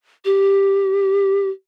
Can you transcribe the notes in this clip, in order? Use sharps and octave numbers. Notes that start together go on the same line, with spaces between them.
G4